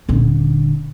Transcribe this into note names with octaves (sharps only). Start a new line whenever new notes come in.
D#1 D3